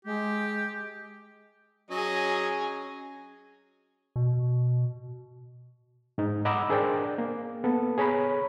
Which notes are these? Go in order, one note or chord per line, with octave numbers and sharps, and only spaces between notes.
G#3 G4
F#3 C#4 G#4 D#5
B2
G#2 D#4
D#5 F#5 A#5 B5 D6 E6
D4 G#4 A#4 C5 D5 G5
A#3
B3 A4
G#4 C#5 A#5 B5